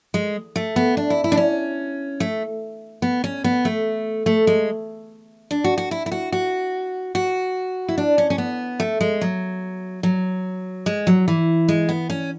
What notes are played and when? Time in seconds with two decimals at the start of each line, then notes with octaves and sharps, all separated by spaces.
0.14 G#3
0.56 A3
0.76 B3
0.97 D4
1.10 E4
1.24 E4
1.32 D4
1.37 C#4
2.20 A3
3.02 B3
3.24 C#4
3.44 B3
3.65 A3
4.26 A3
4.47 G#3
5.51 D4
5.64 F#4
5.78 F#4
5.91 E4
6.06 E4
6.12 F#4
6.32 F#4
7.15 F#4
7.88 E4
7.98 D4
8.18 C#4
8.30 C#4
8.38 B3
8.80 A3
9.01 G#3
9.21 F#3
10.03 F#3
10.86 G#3
11.07 F#3
11.28 E3
11.68 G#3
11.89 B3
12.10 C#4